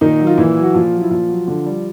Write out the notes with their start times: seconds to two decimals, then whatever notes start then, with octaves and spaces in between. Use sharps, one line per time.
0.01 A#2 D#3 D#4
0.19 F#3
0.27 F4
0.37 A#2 E3 E4
0.56 F#3
0.63 F#4
0.74 A#2 F3 F4
0.93 F#3
1.01 E4
1.10 A#2 F3 F4
1.29 F#3
1.47 D3
1.65 G3